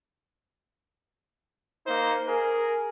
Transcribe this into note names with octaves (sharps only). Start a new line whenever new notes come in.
A#3 D#4 C5
G#4 A#4